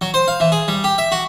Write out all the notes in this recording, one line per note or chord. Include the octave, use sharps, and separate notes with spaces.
F#3
C5
F5
E3
G#4
G3
G4
E5
F#4